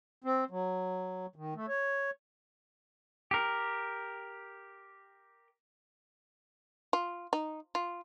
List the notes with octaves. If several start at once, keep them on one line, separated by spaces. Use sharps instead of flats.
C4
F#3
D#3
A3
C#5
G4 A#4
F4
D#4
F4